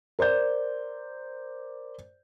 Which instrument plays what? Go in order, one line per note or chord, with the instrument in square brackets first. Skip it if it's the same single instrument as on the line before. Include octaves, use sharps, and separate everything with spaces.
[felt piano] A#4 C5 D5 G6